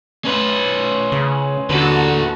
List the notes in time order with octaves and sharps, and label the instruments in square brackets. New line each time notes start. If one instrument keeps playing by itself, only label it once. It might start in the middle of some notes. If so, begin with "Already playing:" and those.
[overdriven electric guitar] C#4 B4
[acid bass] C#3
[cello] D#2 F#4 [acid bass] D3 [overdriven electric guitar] A4 B4